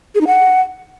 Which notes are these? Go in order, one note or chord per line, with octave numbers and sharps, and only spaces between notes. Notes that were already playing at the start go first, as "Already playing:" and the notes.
G#4
D#4
F#5